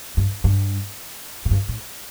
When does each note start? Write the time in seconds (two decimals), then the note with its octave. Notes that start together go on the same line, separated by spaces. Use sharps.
0.17 G2
0.44 G2
1.45 A2
1.51 G2
1.69 A2